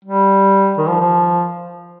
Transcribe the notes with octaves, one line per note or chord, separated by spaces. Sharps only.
G3
D#3
F3
F3